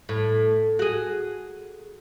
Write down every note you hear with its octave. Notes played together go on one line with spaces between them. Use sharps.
A2
F#4 G#4